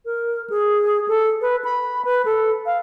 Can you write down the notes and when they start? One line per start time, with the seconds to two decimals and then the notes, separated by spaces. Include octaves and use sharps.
0.05 A#4
0.50 G#4
1.08 A4
1.41 B4
1.65 B5
2.05 B4
2.25 A4
2.66 F5